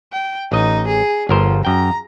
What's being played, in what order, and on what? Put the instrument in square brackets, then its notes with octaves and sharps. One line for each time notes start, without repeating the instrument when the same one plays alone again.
[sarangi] G5
[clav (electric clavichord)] A1 D#5 [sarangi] D#4
[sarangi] G#4
[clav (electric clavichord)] G1 A#4 C5 [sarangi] F3
[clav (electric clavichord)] F#2 G5 [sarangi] A#5